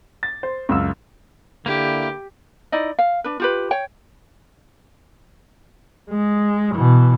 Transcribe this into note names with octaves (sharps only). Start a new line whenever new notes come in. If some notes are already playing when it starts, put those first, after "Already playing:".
A6
C5
C#2 F#2 E6
D3 A#3 E4 G4
D#4 E4 D5 D#5
F5
D4 B4
F4 G4 B4
C#5 G5
G#3
B2 E3